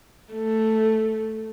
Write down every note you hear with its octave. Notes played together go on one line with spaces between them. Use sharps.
A3